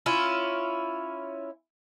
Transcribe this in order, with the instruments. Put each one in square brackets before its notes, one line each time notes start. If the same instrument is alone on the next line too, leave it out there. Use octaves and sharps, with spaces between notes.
[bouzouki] C#4 E4 F4